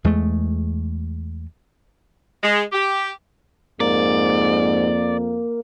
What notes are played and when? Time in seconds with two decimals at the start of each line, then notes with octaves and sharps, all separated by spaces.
0.04 E2 G#3 A3
2.42 G#3
2.72 G4
3.80 F2 G#2 A#3 D5